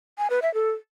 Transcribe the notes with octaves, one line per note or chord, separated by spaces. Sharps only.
G#5
B4
E5
A4